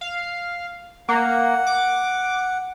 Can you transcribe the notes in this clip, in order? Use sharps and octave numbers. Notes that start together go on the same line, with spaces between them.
F5
A#3 F#5
D6